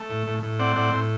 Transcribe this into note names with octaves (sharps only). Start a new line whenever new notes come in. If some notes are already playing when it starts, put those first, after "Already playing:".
Already playing: A3
A2
A2
A2
C4 D5 F#5
A2 D5 F#5
A2